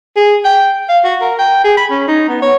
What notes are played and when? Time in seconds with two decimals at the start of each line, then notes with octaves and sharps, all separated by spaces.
0.16 G#4
0.45 G5
0.89 F5
1.05 F#4
1.21 A#4
1.39 G5
1.64 G#4
1.77 B5
1.91 C#4
2.08 D#4
2.28 B3
2.42 C#5